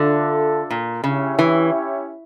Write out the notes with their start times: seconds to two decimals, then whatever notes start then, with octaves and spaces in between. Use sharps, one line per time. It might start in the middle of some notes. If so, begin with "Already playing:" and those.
Already playing: D3 D4 F4 A4 E5
0.70 A#2
1.04 C#3 C#4 E4 G4 C#5 E5
1.39 E3